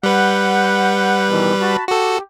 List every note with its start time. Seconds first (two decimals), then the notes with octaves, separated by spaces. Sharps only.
0.03 G3 B4 F#5 G6
1.29 B2 D#3 E3
1.61 F#4 A5 B5
1.88 F#4 G4 A4